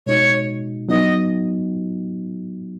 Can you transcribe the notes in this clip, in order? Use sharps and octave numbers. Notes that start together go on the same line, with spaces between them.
B2 G#3 D#4 F#4 C#5
F#3 B3 D#4 F#4 D#5